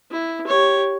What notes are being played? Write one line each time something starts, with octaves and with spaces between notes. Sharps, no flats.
E4
G4 C#5